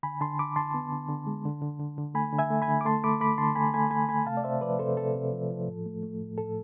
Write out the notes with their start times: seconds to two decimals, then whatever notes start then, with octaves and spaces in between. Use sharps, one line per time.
0.03 D3 G#5 B5
0.20 D3 A5 C6
0.39 D3 B5 D6
0.56 D3 A5 C6
0.74 B3
0.92 D3
1.09 D3
1.27 G#3
1.45 D3
1.62 D3
1.79 D3
1.98 D3
2.15 A3 G#5 B5
2.33 D3
2.39 E5 G#5
2.50 A3
2.62 G#5 B5
2.68 D3
2.81 D6
2.85 A3 A5 C6
3.04 A3 B5 D6
3.20 A3 B5 D6
3.38 D3 A5 C6
3.56 A3 G#5 B5
3.74 A3 G#5 B5
3.91 A3 G#5 B5
4.09 A3 G#5 B5
4.26 C3 F5 A5
4.37 D5
4.44 C3 C5 E5
4.61 F3 B4 D5
4.79 C3 A4 C5
4.97 C3 A4
5.15 C3
5.33 F3
5.50 F3
5.68 A2
5.86 A3
6.03 A3
6.20 A2
6.38 A2 A4